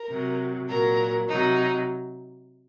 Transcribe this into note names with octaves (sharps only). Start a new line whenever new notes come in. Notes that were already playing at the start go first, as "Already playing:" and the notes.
Already playing: A#4
C3 F#3
A#2 F#3 A#4
C3 F#3 D#4